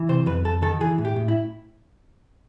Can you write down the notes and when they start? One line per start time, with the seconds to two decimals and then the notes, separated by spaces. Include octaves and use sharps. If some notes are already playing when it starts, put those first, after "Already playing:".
Already playing: E3
0.09 C3 C5
0.26 F2 B4
0.45 F2 A4
0.62 D#3 A4
0.80 E3 G#4
0.98 A2
1.05 G4
1.16 A2
1.28 E4